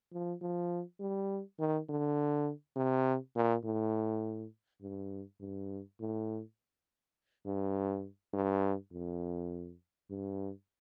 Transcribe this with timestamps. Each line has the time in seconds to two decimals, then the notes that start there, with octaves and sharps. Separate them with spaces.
0.13 F3
0.42 F3
1.00 G3
1.59 D#3
1.89 D3
2.76 C3
3.35 A#2
3.64 A2
4.81 G2
5.40 G2
6.00 A2
7.46 G2
8.34 G2
8.92 F2
10.10 G2